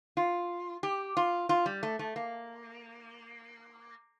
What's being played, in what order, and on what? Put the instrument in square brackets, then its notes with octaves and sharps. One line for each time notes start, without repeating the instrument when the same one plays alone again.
[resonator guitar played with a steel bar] F4
G4
F4
F4
G3
A3
A3
A#3